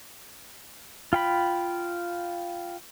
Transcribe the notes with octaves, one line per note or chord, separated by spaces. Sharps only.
F4 G5 B5